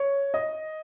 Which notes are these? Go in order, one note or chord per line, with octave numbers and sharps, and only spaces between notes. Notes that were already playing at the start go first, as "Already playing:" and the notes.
Already playing: C#5
D#5